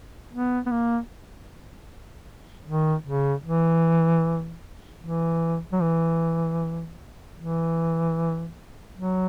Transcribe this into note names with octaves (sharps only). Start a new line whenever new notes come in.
B3
B3
A#3
D#3
C#3
E3
E3
F#3
E3
E3
F#3